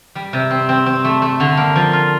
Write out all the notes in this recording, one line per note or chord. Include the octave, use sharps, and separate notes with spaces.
G3
C3
C4
C4
C4
A3
A3
D3
A#3
F3
F4